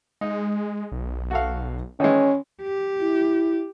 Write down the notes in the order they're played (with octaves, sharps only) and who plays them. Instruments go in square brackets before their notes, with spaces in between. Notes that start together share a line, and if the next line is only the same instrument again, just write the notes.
[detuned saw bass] G#3 [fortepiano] D#4
[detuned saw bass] B1
[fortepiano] F#4 A4 F5
[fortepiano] D#3 E3 G#3 [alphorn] C#4
[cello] G4
[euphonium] E4